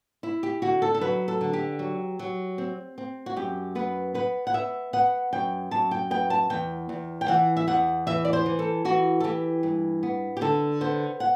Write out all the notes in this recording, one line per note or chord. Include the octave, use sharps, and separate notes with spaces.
E4
G4
D3 F#4
A4
A4
F#3 B4
A4
D3
G4
F#3
F#3
C4
C4
F#4
F#2 G4
B3 B4
B3 B4
F#5
B3 E5
B3 F#5
F#2 G5
F#2 A5
G5
B3 G5
A5
E2 G5
E2
G5
E3 F#5
E5
E2 F#5
E3 E5
D5
C5
E3
A4
E3 F#4
A4
E3 G4
G2
B3
G4
D3 A4
B3 C5
F#5